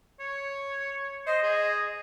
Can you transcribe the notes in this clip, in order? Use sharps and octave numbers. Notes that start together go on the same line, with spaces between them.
C#5
C5 D#5
G#4